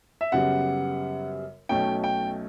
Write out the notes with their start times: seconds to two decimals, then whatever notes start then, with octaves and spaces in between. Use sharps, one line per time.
0.21 E5
0.32 F#2 C#3 G3 B3 F#5
1.69 B1 B2 A3 C#4 G5
2.04 G5